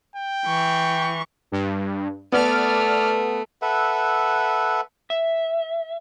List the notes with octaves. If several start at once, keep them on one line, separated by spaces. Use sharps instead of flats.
G5
E3 C#6
G2
A3 B3 D5 F6
A4 B4 E5 F#5
E5